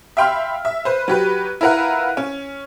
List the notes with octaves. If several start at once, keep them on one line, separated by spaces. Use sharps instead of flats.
E5 F5 G5 B5 C6 F6
E5
B4 C5
F#3 G4 B4
E4 F4 A#4 B4 F#5
C#4